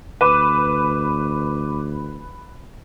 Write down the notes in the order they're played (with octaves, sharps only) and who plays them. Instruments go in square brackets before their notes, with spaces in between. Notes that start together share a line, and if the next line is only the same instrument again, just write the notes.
[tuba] D2 [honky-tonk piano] B4 [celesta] D6 D#7 E7